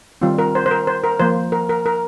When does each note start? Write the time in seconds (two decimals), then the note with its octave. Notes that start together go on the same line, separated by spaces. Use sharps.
0.22 D#3 G3 C4 F4
0.38 A#4
0.55 C5
0.66 C5
0.71 A#4
0.87 C5
1.04 A#4
1.20 F3 A#3 C5
1.52 A#4
1.69 A#4
1.86 A#4